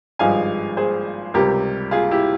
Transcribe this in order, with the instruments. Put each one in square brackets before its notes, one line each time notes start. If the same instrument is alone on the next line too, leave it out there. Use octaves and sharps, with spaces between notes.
[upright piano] G#1 G2 F3 G#3 F5 G#5
G#4 C5
C#2 C3 G3 G4 A#4
F4 G#4
E4 G4